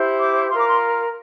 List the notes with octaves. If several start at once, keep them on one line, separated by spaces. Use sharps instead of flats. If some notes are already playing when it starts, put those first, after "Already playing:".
Already playing: E4 G4 C5
D6
F4 A#4 C6
D6
C6